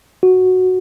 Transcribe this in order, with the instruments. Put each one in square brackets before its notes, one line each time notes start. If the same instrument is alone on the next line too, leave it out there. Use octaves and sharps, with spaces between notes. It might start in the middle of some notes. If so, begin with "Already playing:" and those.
[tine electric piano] F#4